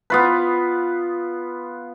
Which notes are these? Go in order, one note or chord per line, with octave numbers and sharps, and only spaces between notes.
B3 F4 B4